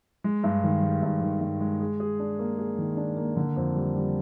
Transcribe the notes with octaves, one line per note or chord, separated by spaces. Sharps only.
G#3
G2
D#3
G#3
G2
D#3
G2
G#3
G#4
G#4
D4
A#3
G#4
D#3
D4
A#3
D3
F2
G3
G3